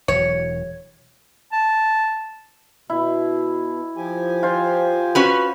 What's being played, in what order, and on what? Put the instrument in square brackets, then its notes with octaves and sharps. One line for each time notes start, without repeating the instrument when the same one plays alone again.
[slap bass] E1 E3 F#3 [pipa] C#5
[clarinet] A5
[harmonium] B2 [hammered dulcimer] E4
[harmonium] F3 G4 G#5
[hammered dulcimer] F4 C5
[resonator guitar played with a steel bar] C#4 F#4 B4